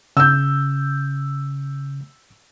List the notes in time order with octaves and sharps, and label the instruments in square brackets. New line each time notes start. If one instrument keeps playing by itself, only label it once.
[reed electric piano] C#3 [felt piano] E6 G6